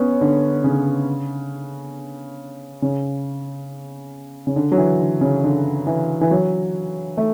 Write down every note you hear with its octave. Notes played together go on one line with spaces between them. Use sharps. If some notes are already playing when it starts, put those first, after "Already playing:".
Already playing: B3 C#4
D3
C#3
C#3
C#3
D3
F#3
E3
D3
C#3
D3
E3
E3
F#3
A3